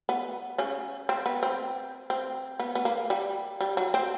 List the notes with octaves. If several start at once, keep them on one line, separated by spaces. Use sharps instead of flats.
B3
C#3 C#4
C4
B3
C4
C4
B3
B3
A#3
G3
G3
F#3
C4